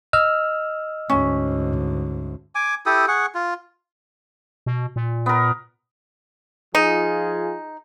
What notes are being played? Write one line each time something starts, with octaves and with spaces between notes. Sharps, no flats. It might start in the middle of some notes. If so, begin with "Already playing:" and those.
D#5 E6 F6
D2 G#2 C#4
G#5 D6
E4 G4 A4 D#6
G#4 F#5 C#6
F4
B2
A#2
B3 A#4
F3 D#4 F4 G#4